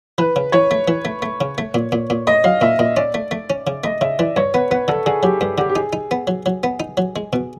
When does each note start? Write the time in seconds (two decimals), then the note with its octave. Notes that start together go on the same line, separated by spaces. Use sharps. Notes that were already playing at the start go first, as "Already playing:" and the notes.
0.18 E3 B4
0.36 C#3
0.52 E3 C#5
0.71 A3
0.88 E3
1.05 A3
1.22 A3
1.41 C#3
1.58 A3
1.74 A#2
1.92 A#2
2.10 A#2
2.27 A3 D#5
2.44 F#3 F5
2.61 A#2 E5
2.79 A#2 D#5
2.97 C#4 D5
3.14 A3
3.31 A3
3.50 C#4
3.67 C#3
3.84 A3 D#5
4.01 C#3 E5
4.19 E3 D5
4.36 G2 C#5
4.54 B3 B4
4.71 B3 B4
4.88 D3 A4
5.06 D3 G#4
5.23 F#3 G4
5.41 G2
5.58 D3 G4
5.69 G4
5.76 D#4 G#4
5.93 D#4
6.11 B3
6.27 F#3
6.46 F#3
6.63 B3
6.80 D#4
6.97 F#3
7.16 G#3
7.33 B2